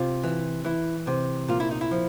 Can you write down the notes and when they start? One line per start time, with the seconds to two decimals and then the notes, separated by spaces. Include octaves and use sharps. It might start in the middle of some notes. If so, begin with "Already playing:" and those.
Already playing: C3 F4
0.23 E3
0.65 E3 E4
1.07 C3
1.48 A#2 F4
1.60 E4
1.71 D#4
1.81 E4
1.91 F3